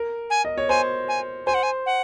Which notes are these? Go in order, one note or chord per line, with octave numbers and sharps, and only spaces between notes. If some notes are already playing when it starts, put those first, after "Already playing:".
Already playing: A#4
G#5
D#5
C#5
C5 G#5
G#5
C5 G#5
F#5
G#5
F#5